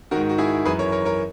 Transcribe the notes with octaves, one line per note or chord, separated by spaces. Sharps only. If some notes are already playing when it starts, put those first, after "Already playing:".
G#2 D#3 F#4 A#4
F#4
E4 G#4
F#2 E3 G#4 B4
A#4 C#5
A#4 C#5
A#4 C#5